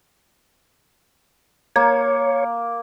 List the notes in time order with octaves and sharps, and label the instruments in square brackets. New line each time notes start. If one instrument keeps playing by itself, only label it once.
[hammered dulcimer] A#3 [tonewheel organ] C#5